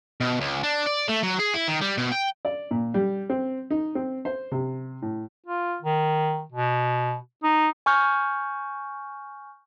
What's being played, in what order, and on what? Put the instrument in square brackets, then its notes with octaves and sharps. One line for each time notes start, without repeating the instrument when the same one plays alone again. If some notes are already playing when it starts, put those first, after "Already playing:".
[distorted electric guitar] B2
C#2
D4
D5
A3
F#3
G#4
E4
D#3
G3
B2
G5
[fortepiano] D5
A#2
G3
C4
D#4
C4
C5
C3
A2
[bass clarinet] F4
D#3
B2
D#4
[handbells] G#5 C#6 F6 G6